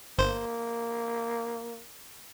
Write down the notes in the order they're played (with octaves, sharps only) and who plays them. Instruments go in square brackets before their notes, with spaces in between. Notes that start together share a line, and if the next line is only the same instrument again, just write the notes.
[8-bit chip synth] G1 C5 [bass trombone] A#3